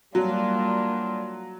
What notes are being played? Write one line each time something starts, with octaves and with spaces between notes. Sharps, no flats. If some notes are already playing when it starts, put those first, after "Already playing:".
F#3 G3 A#3 D4 F4